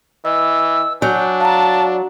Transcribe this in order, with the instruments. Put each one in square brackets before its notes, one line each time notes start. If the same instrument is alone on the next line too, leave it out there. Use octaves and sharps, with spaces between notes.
[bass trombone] E3 [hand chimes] D#5 [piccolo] E6
[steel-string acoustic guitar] F#3 [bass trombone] D4 [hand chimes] G#5 [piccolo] G6
[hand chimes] F5 A#5 [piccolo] A5